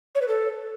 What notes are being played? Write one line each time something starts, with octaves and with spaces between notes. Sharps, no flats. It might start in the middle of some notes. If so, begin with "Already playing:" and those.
C#5
B4
A4